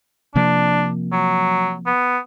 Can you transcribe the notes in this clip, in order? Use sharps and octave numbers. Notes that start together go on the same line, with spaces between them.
C3 F3 A#3 D4
F#3
B3